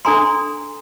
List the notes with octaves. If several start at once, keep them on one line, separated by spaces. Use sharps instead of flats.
D4 A4 G#5 A#5 C6